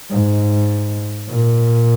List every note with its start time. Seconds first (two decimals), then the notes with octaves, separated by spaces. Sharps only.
0.11 G#2
1.29 A#2